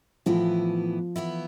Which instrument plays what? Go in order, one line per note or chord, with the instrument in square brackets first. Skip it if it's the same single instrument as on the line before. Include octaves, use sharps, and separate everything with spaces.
[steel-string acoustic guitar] A2 E3 B3 E4 [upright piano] F3
[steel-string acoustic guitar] E3 B3 E4